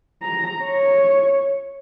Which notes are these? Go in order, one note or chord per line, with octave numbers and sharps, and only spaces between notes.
A#5
C#5